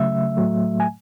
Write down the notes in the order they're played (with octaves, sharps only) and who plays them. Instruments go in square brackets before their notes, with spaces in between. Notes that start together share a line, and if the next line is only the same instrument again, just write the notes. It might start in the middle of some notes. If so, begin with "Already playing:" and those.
Already playing: [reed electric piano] C#3 F#3 A3 E5
A2 F#3 A3
G#5